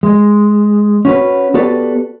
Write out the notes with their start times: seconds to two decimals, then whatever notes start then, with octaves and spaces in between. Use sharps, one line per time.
0.03 G#3
1.05 C#4 F#4 B4
1.54 B3 F#4 G4 A4 B4 D5